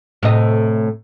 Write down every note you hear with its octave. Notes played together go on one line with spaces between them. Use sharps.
A2 C3 D#5